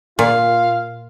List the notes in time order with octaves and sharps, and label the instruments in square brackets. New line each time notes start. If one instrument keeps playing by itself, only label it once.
[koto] A#2 [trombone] F4 [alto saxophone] F5